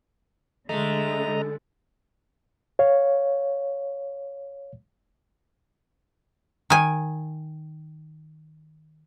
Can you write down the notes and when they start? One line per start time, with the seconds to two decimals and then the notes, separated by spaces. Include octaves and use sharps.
0.69 D3 G#3 A3 D#5 A#5
2.79 C#5 F5
6.70 D#3 G#5